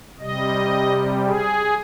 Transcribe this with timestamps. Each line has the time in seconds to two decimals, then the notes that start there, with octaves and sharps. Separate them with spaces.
0.19 C3 G3 D#5
1.25 G#4